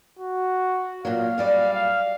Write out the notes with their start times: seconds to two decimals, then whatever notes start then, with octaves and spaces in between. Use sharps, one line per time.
0.19 F#4
1.05 A#2 F#3 F5
1.38 F#2 G3 D5
1.73 F5